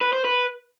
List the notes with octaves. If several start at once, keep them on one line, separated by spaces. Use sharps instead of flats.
B4
C5
B4